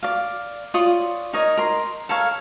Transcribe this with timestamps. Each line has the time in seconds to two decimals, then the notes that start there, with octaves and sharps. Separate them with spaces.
0.03 D5 F5
0.74 F4 C#5 D5 D#6
1.33 D#4 A#4 C#5 D#5
1.57 A#4 C6
2.09 A4 A#4 C#5 F5